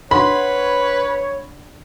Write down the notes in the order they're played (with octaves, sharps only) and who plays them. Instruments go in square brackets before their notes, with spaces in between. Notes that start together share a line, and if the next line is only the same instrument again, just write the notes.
[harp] D4 F#5 C6 [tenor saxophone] B4 [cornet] C#5 [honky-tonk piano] B5